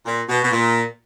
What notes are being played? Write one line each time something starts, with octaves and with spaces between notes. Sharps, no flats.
A#2
B2
B2
A#2